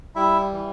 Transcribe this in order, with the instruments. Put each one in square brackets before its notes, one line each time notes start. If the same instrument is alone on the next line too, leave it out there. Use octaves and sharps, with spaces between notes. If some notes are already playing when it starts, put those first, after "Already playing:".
[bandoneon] G3 E4 E5
E3